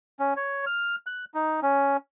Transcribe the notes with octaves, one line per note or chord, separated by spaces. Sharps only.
C#4
C#5
F6
F#6
D#4
C#4